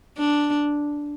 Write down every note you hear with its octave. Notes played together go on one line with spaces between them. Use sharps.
D4